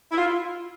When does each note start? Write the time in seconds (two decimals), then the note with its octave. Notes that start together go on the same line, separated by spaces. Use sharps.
0.12 E4
0.17 F4